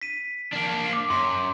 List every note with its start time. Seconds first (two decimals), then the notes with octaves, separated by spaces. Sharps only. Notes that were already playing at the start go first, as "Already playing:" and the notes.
0.01 B6 D#7
0.53 A#3 D4
0.93 D6
1.10 F#2 C6